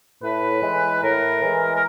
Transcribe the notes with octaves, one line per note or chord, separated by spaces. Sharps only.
A2 B4
E3 G#3
A2 A#4
E3 G#3
A#4